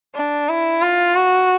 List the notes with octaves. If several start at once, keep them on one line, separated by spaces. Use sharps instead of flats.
D4
E4
F4
F#4